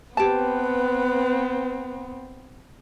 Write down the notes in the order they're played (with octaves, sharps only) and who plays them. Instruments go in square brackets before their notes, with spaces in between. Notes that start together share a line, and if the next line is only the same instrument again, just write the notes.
[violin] B3 C4 [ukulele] G4 A5 [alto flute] B4